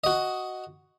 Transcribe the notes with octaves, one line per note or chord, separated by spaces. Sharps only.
F#4 D#5